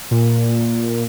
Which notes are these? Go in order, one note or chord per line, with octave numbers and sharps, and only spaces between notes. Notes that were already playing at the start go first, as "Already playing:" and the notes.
A#2